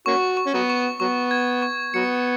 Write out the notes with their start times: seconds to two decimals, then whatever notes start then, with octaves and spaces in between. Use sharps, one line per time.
0.06 A#3 C#4 F#4 C#6
0.37 C#6
0.46 C#4
0.54 F#3 B3
0.70 C#6
1.00 F#3 B3 C#6
1.31 G#6
1.62 C#6
1.94 F#3 B3 C#7